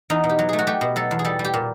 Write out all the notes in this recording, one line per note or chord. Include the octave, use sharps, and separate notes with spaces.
E2 D#4
B2
G4
F#3
A3 G#4
F#4
A3 G4
B2
F#3 A4
E2
G#4
G3 A4
G3
G4
A#2